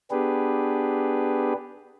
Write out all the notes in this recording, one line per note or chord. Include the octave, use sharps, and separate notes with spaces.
B3 D4 G4 G#4 B4